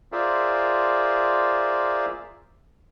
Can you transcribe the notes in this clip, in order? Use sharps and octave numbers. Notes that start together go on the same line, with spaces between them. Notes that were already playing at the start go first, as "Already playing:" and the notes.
F4 G#4 A#4 C5 D5 E5